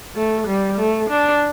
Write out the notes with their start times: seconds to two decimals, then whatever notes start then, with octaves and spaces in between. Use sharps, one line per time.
0.16 A3
0.47 G3
0.78 A3
1.10 D4